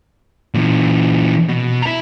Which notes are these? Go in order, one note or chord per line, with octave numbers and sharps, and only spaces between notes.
A#2 E3
B2
E4 A#5